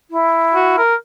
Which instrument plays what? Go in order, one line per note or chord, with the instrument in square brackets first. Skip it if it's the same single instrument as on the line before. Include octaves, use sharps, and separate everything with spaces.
[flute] E4
[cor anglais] F#4
A#4